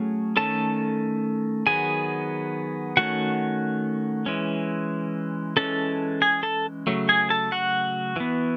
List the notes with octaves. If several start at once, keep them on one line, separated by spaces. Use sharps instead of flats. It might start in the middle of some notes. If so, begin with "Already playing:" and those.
Already playing: F#3 A3 C#4 G#4
D#3 A3 C#4 A4 A5
D#3 F#3 B3 G#4 G#5
D#3 A3 C#4 F#4 F#5
E3 G#3 C#4
E3 G#3 C#4 A4 A5
G#4 G#5
A4 A5
C#3 F#3 A3
G#4 G#5
A4 A5
F#4 F#5
E3 B3